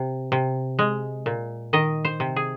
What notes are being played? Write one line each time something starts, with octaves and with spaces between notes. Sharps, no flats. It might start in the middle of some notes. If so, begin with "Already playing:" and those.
Already playing: C3
C3
G#3
A#2
D#3 D#5
C5
C3
G#4